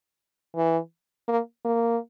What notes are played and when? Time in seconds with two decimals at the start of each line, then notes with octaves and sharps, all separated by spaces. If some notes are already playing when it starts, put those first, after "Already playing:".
0.56 E3
1.28 A#3
1.65 A#3